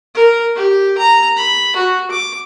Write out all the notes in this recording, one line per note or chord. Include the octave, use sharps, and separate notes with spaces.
A#4
G4
A#5
B5
F#4
D6